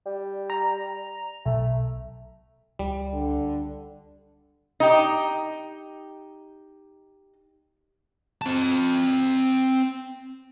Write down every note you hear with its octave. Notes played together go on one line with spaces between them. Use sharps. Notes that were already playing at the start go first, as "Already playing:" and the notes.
G3
A#5
B1 A3
C#2 G3
D3
D#4 G4
C4 A5